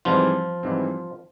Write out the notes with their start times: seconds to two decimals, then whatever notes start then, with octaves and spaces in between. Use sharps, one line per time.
0.05 G#2 E3 F3 G3 C4 F4
0.63 G#2 E3 G3 C4